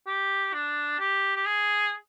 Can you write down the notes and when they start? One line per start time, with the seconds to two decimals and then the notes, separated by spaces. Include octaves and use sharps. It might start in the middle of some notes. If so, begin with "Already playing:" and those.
0.07 G4
0.54 D4
0.99 G4
1.35 G4
1.46 G#4